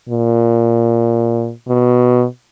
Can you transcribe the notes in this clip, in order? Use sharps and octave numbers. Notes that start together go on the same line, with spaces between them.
A#2
B2